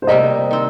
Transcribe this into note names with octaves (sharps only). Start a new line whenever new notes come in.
C5
C3 G3 A#3 G4 D#5
D#3 C4